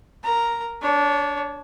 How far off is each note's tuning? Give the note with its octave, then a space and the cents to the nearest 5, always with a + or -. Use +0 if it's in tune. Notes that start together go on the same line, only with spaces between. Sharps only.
A#4 +0 A#5 +0
D4 -20 C#5 +10